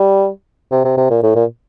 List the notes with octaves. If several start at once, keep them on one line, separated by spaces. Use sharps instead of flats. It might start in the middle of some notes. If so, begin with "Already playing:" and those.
Already playing: G3
C3
C3
C3
A#2
A2
A#2